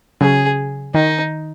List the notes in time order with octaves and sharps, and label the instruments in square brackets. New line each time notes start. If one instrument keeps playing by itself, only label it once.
[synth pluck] C#3 F#3 [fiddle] G#4
[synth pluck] D#3 [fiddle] D#4